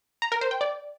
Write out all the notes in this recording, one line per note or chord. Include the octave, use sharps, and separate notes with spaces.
A#5
A#4
C5
G5
D5